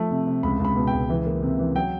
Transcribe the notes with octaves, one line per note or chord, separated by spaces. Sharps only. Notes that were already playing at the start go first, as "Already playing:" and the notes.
Already playing: F3 A3
C3
C3
C#2 B5
C#2
B5
B2
G5
C#2
E3
A#3
C3
E3
F#3 G5